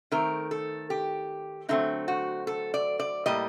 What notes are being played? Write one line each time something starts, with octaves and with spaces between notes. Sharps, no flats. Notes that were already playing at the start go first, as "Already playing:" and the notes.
D#3 A3 C4 A#4
A4
G4
D3 F#3 A3 C4 D#4
F#4
A4
D5
D5
A2 G3 A#3 D#5